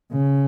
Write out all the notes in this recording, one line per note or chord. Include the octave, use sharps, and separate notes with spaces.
C#3